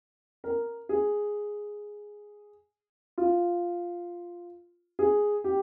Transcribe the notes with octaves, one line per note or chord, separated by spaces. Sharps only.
A#4
G#4
F4
G#4
G4